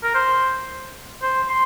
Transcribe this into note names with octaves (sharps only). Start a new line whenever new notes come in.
A#4
C5
C5
C6